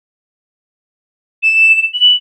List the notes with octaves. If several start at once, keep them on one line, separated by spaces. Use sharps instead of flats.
E7
F#7